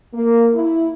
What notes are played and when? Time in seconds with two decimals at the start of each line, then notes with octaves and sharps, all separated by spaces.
0.14 A#3
0.54 E4